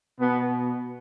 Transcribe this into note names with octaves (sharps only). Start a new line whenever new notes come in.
B2 B3